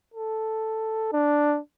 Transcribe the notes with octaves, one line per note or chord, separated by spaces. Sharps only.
A4
D4